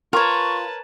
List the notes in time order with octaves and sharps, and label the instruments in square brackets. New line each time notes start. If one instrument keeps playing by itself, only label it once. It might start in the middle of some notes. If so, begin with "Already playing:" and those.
[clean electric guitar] F4 [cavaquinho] A#4 C#5 [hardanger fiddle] B4 A5 [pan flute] C#6